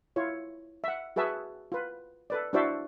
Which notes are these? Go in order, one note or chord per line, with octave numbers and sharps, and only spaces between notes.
E4 F4 C#5
E5 F#5
F#4 G#4 B4 E5 A5
F4 B4
A4 B4 D5
D4 E4 F#4 C5 D5 E5